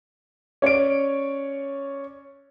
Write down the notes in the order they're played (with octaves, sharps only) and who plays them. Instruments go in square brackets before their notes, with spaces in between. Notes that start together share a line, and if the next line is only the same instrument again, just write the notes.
[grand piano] C#4 C#5 D5 D7